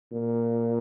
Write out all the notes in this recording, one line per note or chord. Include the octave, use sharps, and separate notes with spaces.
A#2